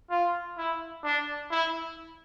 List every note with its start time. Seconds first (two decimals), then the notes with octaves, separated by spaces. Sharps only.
0.11 F4
0.58 E4
1.04 D4
1.51 E4